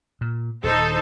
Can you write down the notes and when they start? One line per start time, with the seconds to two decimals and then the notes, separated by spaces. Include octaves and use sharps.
0.21 A#2
0.64 D#1 D#3 D#4 A4 C5